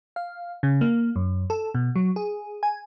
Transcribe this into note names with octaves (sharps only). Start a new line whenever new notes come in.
F5
C#3
A#3
F#2
A4
B2
F#3
G#4
G#5